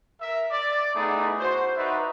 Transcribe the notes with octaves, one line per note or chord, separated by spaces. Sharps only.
A#4 E5
D5
A3 B3 D#4 E4 G#4
F#4 C5
D#4 F#4 B4 D5 E5